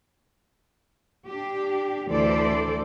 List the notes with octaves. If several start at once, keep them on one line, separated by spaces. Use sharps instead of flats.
D4 G4
D2 D3 E3 A4 C5 D5